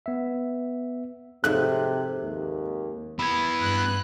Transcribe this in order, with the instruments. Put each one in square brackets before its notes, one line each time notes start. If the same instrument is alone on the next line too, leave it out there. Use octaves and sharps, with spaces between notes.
[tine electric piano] B3 E5
[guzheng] F2 G#2 E5 [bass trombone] C3 [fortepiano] F#6
[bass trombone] D#2
[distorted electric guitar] B3 E4 [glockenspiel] B5 G#6
[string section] G2 F#6